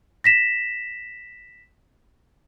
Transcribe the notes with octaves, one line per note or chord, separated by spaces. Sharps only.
A#6 B6 E7